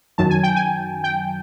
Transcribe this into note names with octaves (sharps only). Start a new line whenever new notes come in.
F#2 D#3 F#3 A5
G#5
G5
G#5
G5